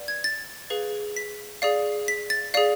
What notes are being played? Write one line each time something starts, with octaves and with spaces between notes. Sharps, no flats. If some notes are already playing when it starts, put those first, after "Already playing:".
Already playing: B4 D5 F#5
G#6
A6
G#4 B4 F5
B6
G#4 D5 F5
B6
A6
G#4 D5 F5